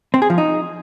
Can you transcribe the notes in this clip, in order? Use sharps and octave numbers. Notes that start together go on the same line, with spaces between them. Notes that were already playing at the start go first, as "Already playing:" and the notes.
C4
G#4
F3
D#4